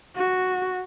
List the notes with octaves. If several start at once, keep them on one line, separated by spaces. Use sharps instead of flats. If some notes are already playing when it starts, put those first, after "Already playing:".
F#4